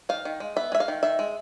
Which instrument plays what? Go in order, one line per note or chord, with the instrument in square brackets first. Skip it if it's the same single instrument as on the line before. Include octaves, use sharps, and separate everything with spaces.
[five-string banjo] D#3 F5
D#3
G#3
B3 E5
G#3 E5
F5
D#3
D#3 E5
G#3